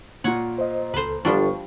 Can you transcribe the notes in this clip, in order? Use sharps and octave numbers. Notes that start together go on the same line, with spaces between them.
A#2 F4 C#5 F#5
C5 D#5
C#2 A4 B4 C5
G1 F3 G3 D4 F4 C#6